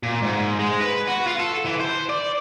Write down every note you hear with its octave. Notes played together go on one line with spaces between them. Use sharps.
A#2
G#2
G#3
B4
F#4
F4
A4
E3
C5
D5